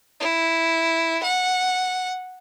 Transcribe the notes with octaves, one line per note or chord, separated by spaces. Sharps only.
E4
F#5